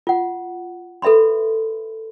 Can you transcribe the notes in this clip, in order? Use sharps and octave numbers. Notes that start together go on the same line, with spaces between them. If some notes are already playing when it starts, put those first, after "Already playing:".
F4 F#5
A4 B4 E5 B5 C6